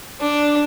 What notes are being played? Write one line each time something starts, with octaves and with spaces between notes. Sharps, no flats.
D4